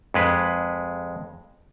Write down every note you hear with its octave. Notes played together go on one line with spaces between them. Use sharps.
F2 G#3 B4